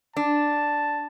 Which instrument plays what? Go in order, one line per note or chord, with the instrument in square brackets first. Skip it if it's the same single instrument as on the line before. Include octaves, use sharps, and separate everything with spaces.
[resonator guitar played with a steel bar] D4 [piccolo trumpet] A5